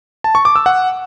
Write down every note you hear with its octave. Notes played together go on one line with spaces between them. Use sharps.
A5
C#6
D6
E6
F#5